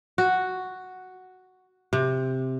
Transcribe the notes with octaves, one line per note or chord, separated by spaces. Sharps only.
F#4
C3